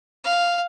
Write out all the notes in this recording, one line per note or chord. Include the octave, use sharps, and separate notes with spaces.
F5